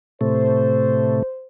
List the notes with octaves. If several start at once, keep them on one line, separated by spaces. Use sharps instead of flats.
A2 C3 A3 C5